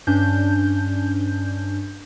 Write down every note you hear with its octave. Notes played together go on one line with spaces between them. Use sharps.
G2 C#4 D4 G6